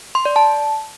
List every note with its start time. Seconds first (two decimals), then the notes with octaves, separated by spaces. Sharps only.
0.15 C6
0.25 D5
0.36 A5